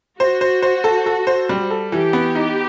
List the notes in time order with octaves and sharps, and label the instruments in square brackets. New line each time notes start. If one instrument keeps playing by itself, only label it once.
[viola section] F#4 [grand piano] C5
[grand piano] C5
C5
A4
A4
C5
G3
A4
[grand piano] E3 [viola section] G4
[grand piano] B3
D#4